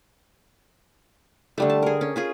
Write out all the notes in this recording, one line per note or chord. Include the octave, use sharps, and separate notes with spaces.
D3 G3 A3
A5
G#4 A#4
C#4
C#4 F4 G#4